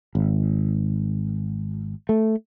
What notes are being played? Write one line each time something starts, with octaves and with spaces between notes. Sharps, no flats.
G#1
A3